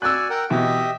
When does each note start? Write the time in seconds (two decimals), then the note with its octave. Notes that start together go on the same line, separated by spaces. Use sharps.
0.02 F#4 D5 G#5 E6 F#6
0.30 A#4 F#5 G5
0.50 B2 E3 G4 D#5 E5